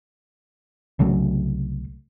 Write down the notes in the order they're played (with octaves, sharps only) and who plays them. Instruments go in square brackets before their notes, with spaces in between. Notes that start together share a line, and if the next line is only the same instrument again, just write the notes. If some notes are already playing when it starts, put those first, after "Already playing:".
[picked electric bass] C2 C#3 F#3 A3